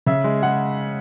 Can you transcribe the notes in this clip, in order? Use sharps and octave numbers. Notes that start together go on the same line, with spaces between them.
C#3 E5
G#3
G#3 F#5